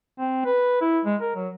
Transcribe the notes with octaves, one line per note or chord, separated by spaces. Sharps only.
C4
B4
E4
G#3
A#4
F#3